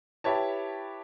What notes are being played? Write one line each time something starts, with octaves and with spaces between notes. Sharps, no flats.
E4 G4 B4 C#5 A5